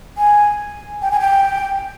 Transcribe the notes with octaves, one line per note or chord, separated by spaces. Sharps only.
G#5
G5
G#5
G5